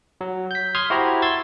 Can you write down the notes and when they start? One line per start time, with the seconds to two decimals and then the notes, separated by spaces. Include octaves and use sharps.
0.21 F#3
0.51 G6 B6
0.75 C6 D#6 F6 G#6
0.90 E4 F#4 G4 C5 A#5
1.22 C6 E6 G#6 A6